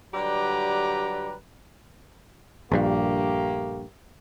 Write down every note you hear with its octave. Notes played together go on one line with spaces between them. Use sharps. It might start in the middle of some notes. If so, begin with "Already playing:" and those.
D3 F#3 G3 G4 B4 A#5
A#1 G2 A3 A#3 G4